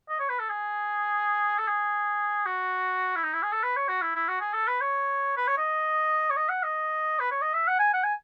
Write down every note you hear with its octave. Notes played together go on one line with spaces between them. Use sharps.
D#5
C#5
B4
A4
G#4
A4
G#4
F#4
E4
D#4
E4
G#4
A4
B4
C#5
F#4
E4
E4
F#4
G#4
A4
B4
C#5
B4
C#5
D#5
C#5
D#5
F#5
D#5
B4
C#5
D#5
E5
F#5
G#5
F#5
G#5